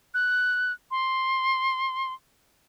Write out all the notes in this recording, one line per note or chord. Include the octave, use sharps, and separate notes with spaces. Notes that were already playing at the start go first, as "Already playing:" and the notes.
F#6
C6